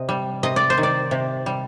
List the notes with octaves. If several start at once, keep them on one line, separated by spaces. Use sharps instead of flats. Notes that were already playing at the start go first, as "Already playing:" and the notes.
Already playing: C3 D#5
G3
C3 D#5
D5
C5
D#3
D5
C3
G3